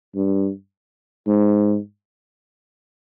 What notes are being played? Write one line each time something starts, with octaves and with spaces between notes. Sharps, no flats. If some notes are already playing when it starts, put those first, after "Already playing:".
G2
G#2